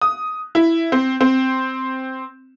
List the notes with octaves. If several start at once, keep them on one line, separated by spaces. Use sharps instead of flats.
D#6
E4
C4
C4